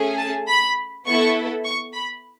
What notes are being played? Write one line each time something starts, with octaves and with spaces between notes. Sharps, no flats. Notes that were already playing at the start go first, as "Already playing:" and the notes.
Already playing: A3 C#4 G#4
A5
B5
B3 E4 A4 C#6
C#6
B5